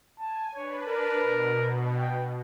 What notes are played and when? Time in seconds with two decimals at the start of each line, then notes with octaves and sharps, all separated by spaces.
0.19 G#5 A5
0.55 D4 B4 C#5
0.87 A#4
1.20 B2
1.98 G5